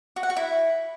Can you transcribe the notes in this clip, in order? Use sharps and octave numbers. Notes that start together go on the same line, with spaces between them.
F#4
F#5
F#4
E4